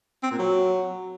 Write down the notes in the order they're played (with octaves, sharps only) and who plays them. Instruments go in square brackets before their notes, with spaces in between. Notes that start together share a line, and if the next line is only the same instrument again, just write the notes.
[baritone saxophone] C4
A#2
F#3